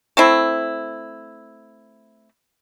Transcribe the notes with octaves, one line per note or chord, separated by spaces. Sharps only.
A3 C4 E4